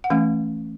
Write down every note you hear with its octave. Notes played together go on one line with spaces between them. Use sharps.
F#5
E3 A3 C#4 F5